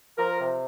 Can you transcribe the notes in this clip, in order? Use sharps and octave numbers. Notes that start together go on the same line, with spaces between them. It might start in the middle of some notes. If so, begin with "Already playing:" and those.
F3 A#4
C3